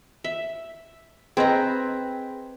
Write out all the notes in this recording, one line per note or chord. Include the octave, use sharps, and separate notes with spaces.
E5
C4 G#4 B4 D#5 A#5